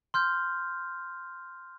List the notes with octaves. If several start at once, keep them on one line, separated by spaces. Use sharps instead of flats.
C6 F6 G6